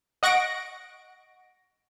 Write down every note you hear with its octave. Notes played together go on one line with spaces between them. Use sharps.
D#5 F#5 C#6 A#6 D7